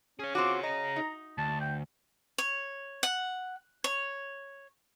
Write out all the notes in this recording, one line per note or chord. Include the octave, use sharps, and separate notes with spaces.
C#4 G#4 C#5
C4 F4 F#4 D6
D#5 A#5
D#4
D2 A5
G5
C#5
F#5
C#5